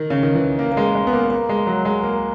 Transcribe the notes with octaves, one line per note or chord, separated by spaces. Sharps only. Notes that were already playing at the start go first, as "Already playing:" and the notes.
Already playing: D#3
C#3
D#3
E3
A#3
A#3
G#3
G#3
B3
A#3
A#3
G#3
F#3
G#3
A#3